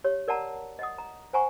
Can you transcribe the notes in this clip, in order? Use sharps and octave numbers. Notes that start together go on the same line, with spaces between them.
G4 C#5
A#4 D5 F#5 A5 A#5
D#5 F#5 D#6
A#5
C5 F#5 G#5 A#5 C#6